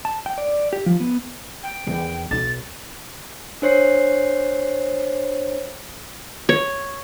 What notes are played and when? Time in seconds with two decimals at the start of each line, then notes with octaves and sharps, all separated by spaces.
0.05 A5
0.26 G5
0.38 D5
0.73 G4
0.86 F3
1.00 B3
1.63 G5
1.87 E2 D#3
2.31 B1 D#4 A6
3.62 D4 C5 C#5 C7
6.49 C#5